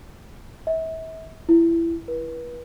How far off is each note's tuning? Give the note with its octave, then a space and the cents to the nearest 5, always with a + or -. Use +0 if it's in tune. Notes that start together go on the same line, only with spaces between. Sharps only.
E5 -35
E4 +20
B4 -35